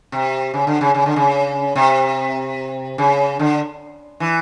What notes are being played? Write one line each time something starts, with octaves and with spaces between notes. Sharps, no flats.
C3
C#3
D3
C#3
C#3
D3
C#3
C3
C#3
D3
E3